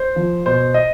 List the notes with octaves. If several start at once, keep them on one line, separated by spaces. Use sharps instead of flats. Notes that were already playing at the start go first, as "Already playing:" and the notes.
Already playing: C5
F3
B2 C5
D#5